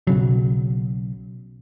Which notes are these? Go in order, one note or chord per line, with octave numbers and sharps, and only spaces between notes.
B1 C#3 F#3